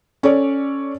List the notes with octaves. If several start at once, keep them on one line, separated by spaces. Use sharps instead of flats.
C#4 A4 C#5 D5